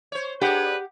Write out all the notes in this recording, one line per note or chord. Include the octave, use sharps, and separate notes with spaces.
C5 C#5
D4 G4 G#4 B4 F#5